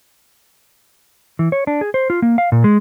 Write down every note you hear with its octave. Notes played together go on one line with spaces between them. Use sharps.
E3
C#5
D4
G#4
C5
F4
A#3
F5
A#2
G#3